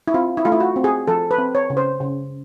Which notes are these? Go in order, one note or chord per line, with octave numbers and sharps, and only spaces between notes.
E4
C4 F4
E4
A3 F4
E4
F#4
C4
G#4
F3 A4
B4
C4
C#5
C#3
C5
C#3